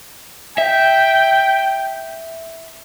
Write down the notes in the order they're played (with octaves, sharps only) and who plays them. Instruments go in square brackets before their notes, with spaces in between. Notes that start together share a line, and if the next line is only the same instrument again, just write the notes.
[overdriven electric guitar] E5 [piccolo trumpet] G5